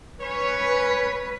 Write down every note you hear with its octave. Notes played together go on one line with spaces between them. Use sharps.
C#4 B4 C#5